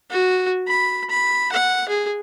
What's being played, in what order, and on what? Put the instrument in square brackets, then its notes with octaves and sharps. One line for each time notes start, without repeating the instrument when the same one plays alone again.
[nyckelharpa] F#4
B5
B5
F#5
G#4